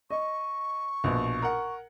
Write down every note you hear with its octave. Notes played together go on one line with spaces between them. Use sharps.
D#5 C#6
A#1 B2
A#4 F#5